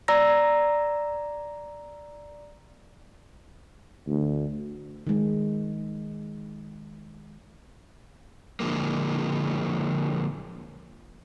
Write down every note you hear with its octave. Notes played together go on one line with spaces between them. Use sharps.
D5 A#5 E6 A#6
D2
D#3 G#3
D3 F3 G#3 A#3